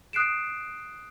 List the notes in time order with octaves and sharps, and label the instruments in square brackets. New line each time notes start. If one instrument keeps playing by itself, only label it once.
[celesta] D#6 F#6 C7 D7 E7